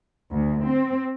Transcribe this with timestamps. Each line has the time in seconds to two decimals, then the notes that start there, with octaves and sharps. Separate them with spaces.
0.32 D2
0.64 C4